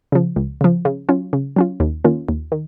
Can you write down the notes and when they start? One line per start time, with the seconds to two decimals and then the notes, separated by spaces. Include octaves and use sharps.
0.12 C#3 F3
0.36 C#2
0.61 C#3 F3
0.85 C#3
1.09 F#3 C#4 F4
1.33 C#3
1.56 F#3 C#4 F4
1.80 D#2
2.04 D#3 A#3 C#4 F4
2.29 D#2
2.52 D#3